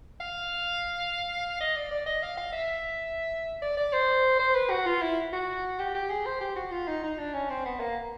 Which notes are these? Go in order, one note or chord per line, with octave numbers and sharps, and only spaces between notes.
F5
D#5
D5
D5
D#5
F5
F5
E5
D5
D5
C5
C5
B4
F#4
F4
E4
F#4
G4
G4
G#4
C5
G4
F#4
F4
D#4
D#4
D4
C#4
C4
B3
A#3